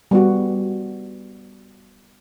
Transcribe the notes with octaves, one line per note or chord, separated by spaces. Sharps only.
G3 B3 F#4